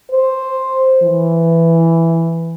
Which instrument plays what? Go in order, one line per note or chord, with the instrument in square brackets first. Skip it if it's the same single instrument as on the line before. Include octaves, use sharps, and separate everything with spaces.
[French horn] C5
E3